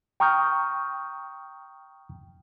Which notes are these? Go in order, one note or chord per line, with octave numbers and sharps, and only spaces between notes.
G5 A#5 C#6 D#6 F6 G6